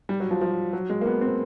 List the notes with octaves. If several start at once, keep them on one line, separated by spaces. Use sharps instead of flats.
G3
F#3
F3
F3
F#3
G#3
A#3
B3
C4